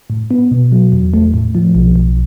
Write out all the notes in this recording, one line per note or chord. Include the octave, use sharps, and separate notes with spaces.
A2
B3
B2
F#3
E2
A3
A2
F3
B1
B1